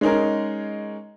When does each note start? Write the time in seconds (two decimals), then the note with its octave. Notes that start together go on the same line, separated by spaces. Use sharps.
0.01 G#3 C#4 D#4 G#4 A#4